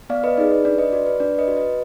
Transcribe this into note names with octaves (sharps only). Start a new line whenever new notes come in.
B3 D5 F5
B4 D#5
D#4 G#4 D5
B4
D4 D5
B4 D#5
F#4 D5
B4
D4 D5
B4 D#5
F#4
B4 D#5